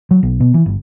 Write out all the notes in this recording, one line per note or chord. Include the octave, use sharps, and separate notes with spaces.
F#3
B1
B2
E3
G1